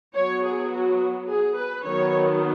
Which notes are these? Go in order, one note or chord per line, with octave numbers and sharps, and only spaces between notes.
F#3 B3 C#5
G#4
F#4
G#4
B4
D#3 F#3 B3 C#5